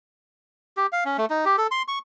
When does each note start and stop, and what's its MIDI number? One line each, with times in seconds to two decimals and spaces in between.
0.77 0.86 67
0.92 1.04 77
1.05 1.17 61
1.18 1.26 57
1.30 1.45 63
1.45 1.56 67
1.58 1.67 69
1.71 1.82 84
1.88 1.99 85